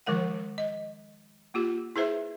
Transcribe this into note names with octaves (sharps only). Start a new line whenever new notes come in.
D#3 F3 G#3 A#4 F#5
D#5
A#3 F4 G4
E4 G#4 B4 C5 E5